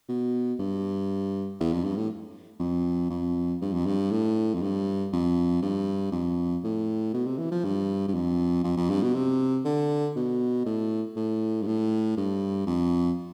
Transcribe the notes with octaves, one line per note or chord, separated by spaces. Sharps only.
B2
G2
E2
F2
G2
A2
F2
F2
G2
F2
G2
A2
F2
G2
F2
G2
F2
A2
B2
C3
E3
F3
G2
G2
F2
F2
F2
G2
B2
C3
D3
B2
A2
A2
G2
A2
G2
F2